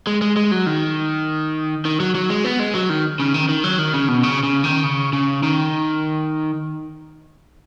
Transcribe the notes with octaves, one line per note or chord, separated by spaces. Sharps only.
G#3
G#3
G#3
F#3
D#3
D#3
F#3
F#3
G#3
B3
G#3
F#3
D#3
C#3
D#3
D#3
F#3
D#3
C#3
B2
C#3
C#3
D#3
C#3
C#3
D#3